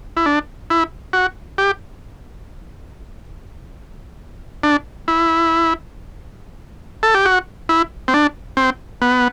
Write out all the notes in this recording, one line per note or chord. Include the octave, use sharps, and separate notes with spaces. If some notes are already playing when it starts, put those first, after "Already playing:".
E4
D4
E4
F#4
G4
D4
E4
A4
G4
F#4
E4
C4
D4
C4
B3